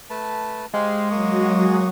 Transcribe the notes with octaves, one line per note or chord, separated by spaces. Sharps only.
A3 B4 A5
G#3 G4 C5 F5
F#3 A#3 F#4 C#6 D#6